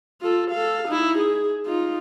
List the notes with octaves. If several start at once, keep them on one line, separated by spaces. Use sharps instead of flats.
F4 A4
A4 F5
D#4 E4
G#4
D#4 F4